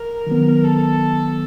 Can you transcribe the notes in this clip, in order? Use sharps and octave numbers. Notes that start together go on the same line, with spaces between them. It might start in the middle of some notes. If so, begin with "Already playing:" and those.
Already playing: A#4
D#3 F#3 B3
A4